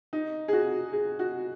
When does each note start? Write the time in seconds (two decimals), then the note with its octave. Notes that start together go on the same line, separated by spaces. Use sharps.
0.13 D#4
0.48 G#4
0.53 F#4
0.93 G#4
1.19 F#4